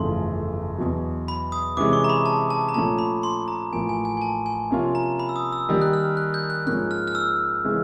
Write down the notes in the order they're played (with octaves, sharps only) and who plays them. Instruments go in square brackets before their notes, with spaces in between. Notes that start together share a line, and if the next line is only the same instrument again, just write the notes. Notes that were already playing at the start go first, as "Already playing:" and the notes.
Already playing: [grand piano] G1 F2 C#3 E3 A3 [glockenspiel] C6
[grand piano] E2 B2 F#3
[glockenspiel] B5
D#6
[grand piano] C3 E3 G#3 C#4 [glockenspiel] D6
[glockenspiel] C#6
A#5
B5
A5
A5
A#5
[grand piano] A#2 F3 A3 C#4 [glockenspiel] A5
[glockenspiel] B5
C6
A#5
[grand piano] A1 A2 F3 A#3 [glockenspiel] G#5
[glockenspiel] G#5
G#5
G#5
A5
G#5
[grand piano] C3 F3 A#3 C#4 F4
[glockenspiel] A#5
B5
E6
D#6
E6
[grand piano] D#3 G3 A#3 [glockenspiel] E6
[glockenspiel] F#6
F6
F#6
G6
F#6
[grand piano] G#2 F3 A#3 C#4 [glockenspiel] F#6
[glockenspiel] F6
F6
E6
[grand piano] C#3 E3 G#3 C#4